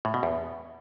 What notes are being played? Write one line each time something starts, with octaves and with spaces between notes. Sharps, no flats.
A2
B2
E2